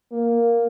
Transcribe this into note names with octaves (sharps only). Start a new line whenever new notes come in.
A#3